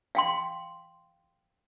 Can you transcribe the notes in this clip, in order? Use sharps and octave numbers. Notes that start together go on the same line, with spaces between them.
F5 G5 C6